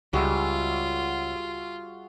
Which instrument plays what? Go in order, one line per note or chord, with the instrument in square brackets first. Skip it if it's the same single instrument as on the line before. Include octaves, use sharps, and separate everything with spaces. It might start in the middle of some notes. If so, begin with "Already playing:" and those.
[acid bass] C#2 [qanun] G3 [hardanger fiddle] F4 [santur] F#4 G#4 E5